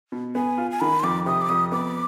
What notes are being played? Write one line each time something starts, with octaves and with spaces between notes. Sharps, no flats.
B2
B3 G#5
F4
G#5
D#3 B5
C6
F2 D6
C3 D#6
D6
F2 D#6
B3 D6